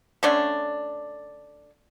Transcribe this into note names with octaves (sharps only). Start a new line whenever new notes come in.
D3 A3 C#4 D4